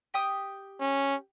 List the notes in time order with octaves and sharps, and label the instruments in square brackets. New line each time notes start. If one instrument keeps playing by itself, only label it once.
[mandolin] G4 G5 D#6
[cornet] C#4